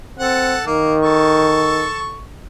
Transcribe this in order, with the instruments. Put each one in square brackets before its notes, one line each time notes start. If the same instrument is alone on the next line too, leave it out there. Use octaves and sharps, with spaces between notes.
[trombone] C4 [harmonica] A4 F#5
[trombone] D#3 [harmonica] A#3
[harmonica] A4 C#6